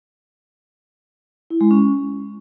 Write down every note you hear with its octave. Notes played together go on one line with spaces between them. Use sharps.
E4
G#3
C#4